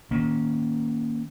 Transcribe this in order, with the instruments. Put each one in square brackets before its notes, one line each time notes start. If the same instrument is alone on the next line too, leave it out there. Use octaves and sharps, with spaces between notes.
[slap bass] D#3 A#3 C#4